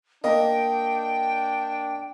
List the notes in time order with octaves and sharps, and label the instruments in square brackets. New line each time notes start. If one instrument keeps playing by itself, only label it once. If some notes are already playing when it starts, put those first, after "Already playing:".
[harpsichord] A#3 [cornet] D4 [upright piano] D#5 [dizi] G5